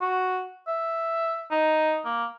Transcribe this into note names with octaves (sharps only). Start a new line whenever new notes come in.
F#4
E5
D#4
A#3